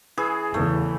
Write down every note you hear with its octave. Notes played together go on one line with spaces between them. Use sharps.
E3 G#4
E2 C#3 E3 A3